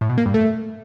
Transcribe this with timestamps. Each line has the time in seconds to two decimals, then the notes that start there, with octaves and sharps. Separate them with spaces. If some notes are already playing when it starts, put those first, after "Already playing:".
0.01 A2
0.09 B2
0.18 A#3
0.26 G2
0.34 A3